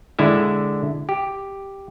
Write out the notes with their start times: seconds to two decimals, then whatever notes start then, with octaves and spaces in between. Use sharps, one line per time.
0.19 D3 G#3 E4 E5
1.09 G4